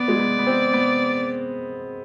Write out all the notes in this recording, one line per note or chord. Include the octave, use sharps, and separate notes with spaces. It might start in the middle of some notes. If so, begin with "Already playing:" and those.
Already playing: B3 D5
G#3
B3
B3
C4
B3